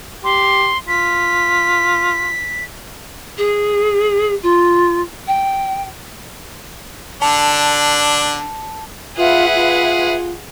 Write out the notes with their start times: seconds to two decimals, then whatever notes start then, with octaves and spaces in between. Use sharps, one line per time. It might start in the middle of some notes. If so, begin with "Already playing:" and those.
0.24 G4 C6
0.88 F4 B6
3.38 G#4
4.43 F4
5.27 G5
7.22 D3 D4 A5 C#7 F7
9.17 F4 G#4 B4 E5 F#5
9.55 F4